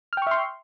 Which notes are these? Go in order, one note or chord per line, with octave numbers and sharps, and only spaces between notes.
E5 G5 C6 C#6 F6